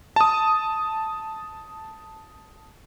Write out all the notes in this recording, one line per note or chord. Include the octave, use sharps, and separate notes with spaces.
A5 D#6